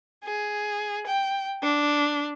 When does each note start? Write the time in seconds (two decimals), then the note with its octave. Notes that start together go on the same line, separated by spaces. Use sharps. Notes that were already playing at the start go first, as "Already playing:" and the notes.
0.24 G#4
1.07 G5
1.63 D4